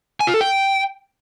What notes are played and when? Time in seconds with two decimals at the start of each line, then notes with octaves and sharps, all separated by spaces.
0.20 G#5
0.27 F4
0.34 A4
0.41 G5